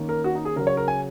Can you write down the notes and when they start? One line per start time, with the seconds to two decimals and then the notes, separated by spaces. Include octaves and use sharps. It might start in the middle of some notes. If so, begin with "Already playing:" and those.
Already playing: D#3 A#3 C#4
0.09 A#4
0.24 F#4
0.35 D#4
0.45 G#4
0.56 C#3 F#3 C#4 A#4
0.67 C#5
0.77 A#4
0.88 G#5